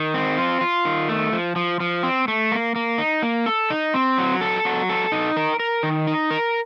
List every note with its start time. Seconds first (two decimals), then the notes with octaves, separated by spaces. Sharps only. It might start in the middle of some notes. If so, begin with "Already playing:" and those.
Already playing: D#3
0.14 C4
0.38 F4
0.61 F4
0.85 D#3
1.09 A3
1.33 F3
1.56 F3
1.80 F3
2.03 C4
2.28 A3
2.52 A#3
2.76 A#3
2.98 D#4
3.23 A#3
3.46 A4
3.70 D#4
3.94 C4
4.18 F#3
4.41 A4
4.65 F#3
4.89 A4
5.12 D#4
5.37 A#4
5.60 A#4
5.83 D#3
6.07 D#4
6.31 A#4